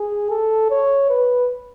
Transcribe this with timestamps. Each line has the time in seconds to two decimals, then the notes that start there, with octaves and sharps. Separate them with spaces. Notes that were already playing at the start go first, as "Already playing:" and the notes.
Already playing: G#4
0.30 A4
0.71 C#5
1.10 B4